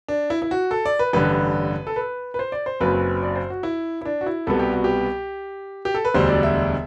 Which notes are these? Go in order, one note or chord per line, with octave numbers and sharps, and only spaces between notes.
D4
E4
E4
F#4
A4
D5
B4
A1 G2 D3 B4
A4
B4
B4
C5
D5
C5
F#1 F#2 F#3 C4 B4
D5
C5
F#4
E4
E4
D4
F#4
E4
C2 B2 G3 B3 A4
G4
F#4
G4
G4
A4
B4
E1 D2 D3 G3 C5
D5
E5